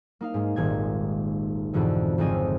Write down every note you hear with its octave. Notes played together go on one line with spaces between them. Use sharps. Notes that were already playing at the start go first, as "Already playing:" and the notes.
A#3 D#4 F5
G#2 G#3
D#1 G#1 G#2 G#6
F2 G#2 B2 D3 E3
G#1 F2 C#3 C4 D#5 G#5